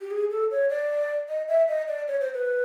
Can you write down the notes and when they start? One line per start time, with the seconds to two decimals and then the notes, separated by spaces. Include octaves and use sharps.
0.01 G4
0.11 G#4
0.31 A4
0.51 C#5
0.70 D5
1.29 D#5
1.48 E5
1.68 D#5
1.88 D5
2.08 C#5
2.21 C5
2.34 B4